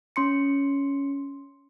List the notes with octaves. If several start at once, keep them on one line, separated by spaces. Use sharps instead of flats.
C#4 C6 C#7